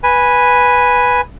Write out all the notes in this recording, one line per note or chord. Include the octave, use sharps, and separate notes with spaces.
B4 G#5